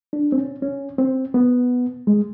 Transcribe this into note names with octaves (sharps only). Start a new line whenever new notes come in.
D4
C4
C#4
C#4
C4
B3
G#3